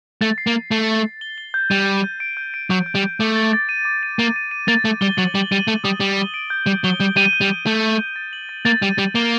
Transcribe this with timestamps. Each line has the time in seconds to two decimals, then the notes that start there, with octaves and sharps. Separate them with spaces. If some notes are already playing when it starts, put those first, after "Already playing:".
0.21 A3 A6
0.38 C7
0.47 A#3
0.54 A6
0.71 A3 C7
0.88 A6
1.04 C7
1.21 G7
1.38 G7
1.54 G6
1.70 G3 D#7
1.87 D#7
2.04 G6
2.20 D7
2.37 G6
2.54 D7
2.70 F#3 G6
2.86 G6
2.95 G3
3.03 G6
3.20 A3 D6
3.36 A6
3.53 A6
3.69 D#7
3.85 D6
4.03 D#7
4.18 A#3 D#7
4.36 D#7
4.51 D#7
4.68 A#3 A6
4.85 A3 A6
5.01 G3 G7
5.17 F#3 F#7
5.34 G3 F#7
5.51 G3 D#7
5.68 A3 F#7
5.84 G3 D#6
6.00 G3 F#7
6.17 G7
6.34 D7
6.50 G6
6.66 G3 D7
6.84 F#3 G7
7.00 G3 G6
7.17 G3 D#7
7.33 G6
7.41 G3
7.49 D#7
7.66 A3 G6
7.83 G6
7.99 G6
8.16 A6
8.33 F#7
8.49 A6
8.65 A#3 A6
8.82 G3 D#7
8.98 G3 A6
9.15 A#3 G7